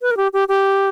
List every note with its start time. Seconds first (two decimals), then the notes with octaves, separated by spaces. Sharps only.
0.02 B4
0.11 A#4
0.17 G4
0.33 G4
0.48 G4